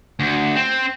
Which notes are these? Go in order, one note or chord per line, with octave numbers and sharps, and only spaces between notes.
D2
C4